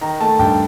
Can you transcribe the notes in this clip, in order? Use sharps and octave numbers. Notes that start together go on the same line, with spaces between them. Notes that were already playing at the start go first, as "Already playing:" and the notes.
D#3 A#5
A3 A5
G2 G5